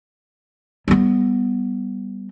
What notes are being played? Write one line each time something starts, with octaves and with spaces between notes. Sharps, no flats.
G3 B3